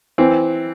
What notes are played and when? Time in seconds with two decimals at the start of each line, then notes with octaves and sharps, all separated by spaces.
0.18 E3 C4